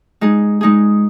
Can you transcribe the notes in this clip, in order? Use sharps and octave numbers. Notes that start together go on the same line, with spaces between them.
G#3 D#4 G#4
G#3 D#4 G#4